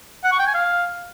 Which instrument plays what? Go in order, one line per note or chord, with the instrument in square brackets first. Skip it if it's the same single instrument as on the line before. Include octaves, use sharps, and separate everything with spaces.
[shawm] F#5
C#6
G5
G#5
F5